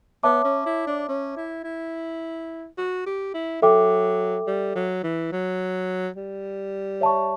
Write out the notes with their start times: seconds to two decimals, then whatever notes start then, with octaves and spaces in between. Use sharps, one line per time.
0.23 B3 C#5 E5 A5 D6
0.44 C#4
0.66 E4
0.87 D4
1.09 C#4
1.37 E4
1.64 E4
2.78 F#4
3.06 G4
3.34 E4
3.62 F#3 A4 E5 G5 D6
4.47 G3
4.75 F#3
5.03 E3
5.32 F#3
6.16 G3
7.01 C#5 E5 A5 C#6